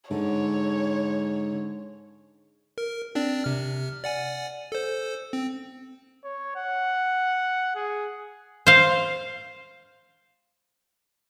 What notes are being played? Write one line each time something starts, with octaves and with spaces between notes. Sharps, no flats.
G#2 D3 C#5
A#4
C4 D4 D5
C3 F6
D5 F#5 G#5
A4 C5
C4
C#5
F#5
G#4
C5 F5